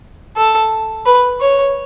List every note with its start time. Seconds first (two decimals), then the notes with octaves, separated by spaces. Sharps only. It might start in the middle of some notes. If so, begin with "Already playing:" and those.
0.37 A4
1.06 B4
1.41 C#5